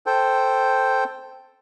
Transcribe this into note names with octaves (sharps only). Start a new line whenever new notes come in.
A4 C5 G5